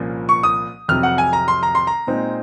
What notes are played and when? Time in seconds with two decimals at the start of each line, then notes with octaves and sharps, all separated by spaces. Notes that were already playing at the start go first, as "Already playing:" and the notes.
Already playing: C2 A#2 F3 A#3 C#4
0.29 C#6
0.43 D#6
0.88 F2 C3 F#3 F6
1.03 F#5
1.18 G#5
1.33 A#5
1.48 C6
1.63 A#5
1.75 C6
1.87 A#5
2.07 A#2 G#3 C4 D#4